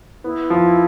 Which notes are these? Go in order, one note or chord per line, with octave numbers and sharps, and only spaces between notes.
B3 E4
F3